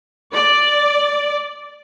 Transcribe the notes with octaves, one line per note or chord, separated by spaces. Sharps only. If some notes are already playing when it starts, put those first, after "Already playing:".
D5